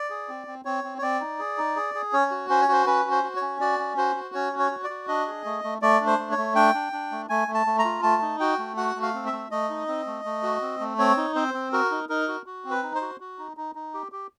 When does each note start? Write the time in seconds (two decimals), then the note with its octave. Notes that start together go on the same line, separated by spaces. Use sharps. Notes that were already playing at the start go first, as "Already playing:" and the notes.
Already playing: D5
0.10 G#4
0.29 C4
0.47 C4
0.65 C4 C#5
0.84 C4
0.98 C#5
1.02 C4 D5
1.21 D#4
1.39 G#4
1.58 D#4
1.76 G#4
1.95 G#4
2.13 C#4 C#5
2.31 F#4
2.50 C#4 C5
2.61 C#5
2.68 F#4 C5
2.86 C#4 B4
3.05 F#4
3.11 C5
3.23 F#4
3.36 C#5
3.42 C#4
3.60 F#4 D5
3.79 C#4
3.97 F#4 C5
4.16 F#4
4.35 C#4 C#5
4.53 F#4
4.59 C#5
4.71 F#4
4.84 D5
4.90 F#4
5.08 D4 D#5
5.27 G#4
5.45 A3
5.64 A3
5.82 A3 D5
6.01 D4
6.06 C5
6.19 A3
6.31 C#5
6.37 A3
6.55 D4 G5
6.74 D4
6.93 D4
7.12 A3
7.29 A3 G#5
7.48 A3
7.54 A5
7.66 A3
7.79 A#5
7.85 F4
8.03 A3 A5
8.22 D#4
8.40 F#4 G5
8.59 A3
8.77 F#4 F#5
8.96 A3
9.02 F5
9.14 C4
9.26 E5
9.32 A3
9.51 A3 D#5
9.69 D#4
9.88 C4
10.06 A3
10.25 A3
10.43 F#4
10.62 C4
10.80 A3
10.99 C4 C#5
11.17 D#4
11.35 C4 C5
11.54 C4
11.72 F#4 A#4
11.91 D#4
12.09 D#4 A#4
12.28 F#4
12.46 F#4
12.65 C4
12.71 B4
12.83 D#4
12.95 C5
13.01 F#4
13.20 F#4
13.39 D#4
13.57 D#4
13.75 D#4
13.94 G4
14.12 G4